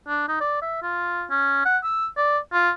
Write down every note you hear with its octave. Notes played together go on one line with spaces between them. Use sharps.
D4
D#4
D5
E5
F4
C#4
F#5
E6
D5
F4